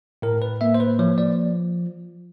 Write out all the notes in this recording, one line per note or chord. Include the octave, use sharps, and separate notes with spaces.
A2 A#4
B4
A#3 E5
C5
B4
F3 C#5
D5